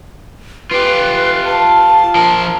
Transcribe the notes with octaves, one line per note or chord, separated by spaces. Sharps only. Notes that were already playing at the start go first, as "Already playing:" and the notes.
F4 G4 B4
A5
F3 A#4